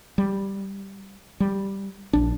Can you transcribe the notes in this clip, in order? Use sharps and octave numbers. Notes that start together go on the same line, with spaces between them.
G3
G3
A#1 D4